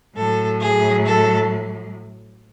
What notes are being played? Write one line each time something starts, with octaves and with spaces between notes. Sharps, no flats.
A2 F#3 A4
G#4
A4